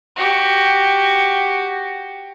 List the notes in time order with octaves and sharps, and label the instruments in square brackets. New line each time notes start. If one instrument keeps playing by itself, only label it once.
[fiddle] F#4 G4